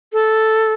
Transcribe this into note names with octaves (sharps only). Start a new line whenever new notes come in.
A4